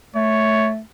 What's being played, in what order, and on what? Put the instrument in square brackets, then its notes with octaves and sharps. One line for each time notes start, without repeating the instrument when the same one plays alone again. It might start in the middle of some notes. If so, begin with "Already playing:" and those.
[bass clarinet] A3 [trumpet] C#5